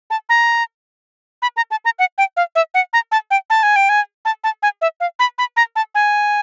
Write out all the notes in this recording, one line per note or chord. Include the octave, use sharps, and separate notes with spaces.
A5
A#5
B5
A#5
A5
A#5
F#5
G5
F5
E5
F#5
A#5
A5
G5
A5
G#5
G5
G#5
A5
A5
G#5
E5
F5
B5
B5
A#5
A5
G#5